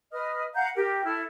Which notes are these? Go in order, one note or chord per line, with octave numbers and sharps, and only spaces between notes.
B4 D#5 D#6 F6
F5 F#5 A#5 G6
G4 A#4 G5
E4 A4 F6